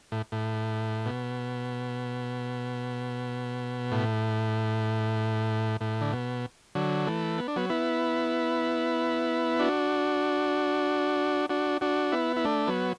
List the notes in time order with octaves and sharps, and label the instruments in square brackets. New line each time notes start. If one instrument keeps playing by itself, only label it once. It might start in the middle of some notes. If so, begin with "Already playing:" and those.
[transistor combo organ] A2
A2
B2
A2
A2
D3
B2
D3 F#3
E3 A3
B3
D4
F#3 B3
B3 E4
D4 F#4
D4 F#4
D4 F#4
B3 E4
E4
A3 D4
F#3 B3